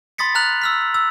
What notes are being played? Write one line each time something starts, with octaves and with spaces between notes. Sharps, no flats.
B5 C6 D#6 A6 B6 C#7
A#5 F6 F#6 F7 F#7
E6 F6 B6
E6